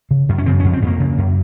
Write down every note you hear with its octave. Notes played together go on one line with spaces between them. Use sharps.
C#3
F#2
C#4
C#3 C4
C#4
F2
C4
F2 A#3
C#3
F#2